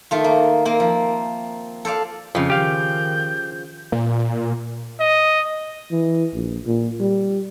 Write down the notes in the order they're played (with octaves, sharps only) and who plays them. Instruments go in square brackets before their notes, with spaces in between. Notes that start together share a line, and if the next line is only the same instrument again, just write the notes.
[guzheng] D#3 A3 F4
A#3
A#3 C4
F3
A4 C5 D5 F5
[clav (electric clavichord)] F2 [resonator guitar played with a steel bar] C#3 F3
[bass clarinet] D#3 [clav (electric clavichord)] G4 F5 [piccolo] G6
[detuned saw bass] A#2
[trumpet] D#5
[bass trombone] E3
A#1
A#2
G3